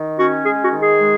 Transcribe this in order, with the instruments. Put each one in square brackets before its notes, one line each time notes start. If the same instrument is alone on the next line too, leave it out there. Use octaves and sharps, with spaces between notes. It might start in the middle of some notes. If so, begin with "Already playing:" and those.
Already playing: [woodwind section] D#3
C#4 F#4
G#3 G#4
F#4
D#3
G#4
G#3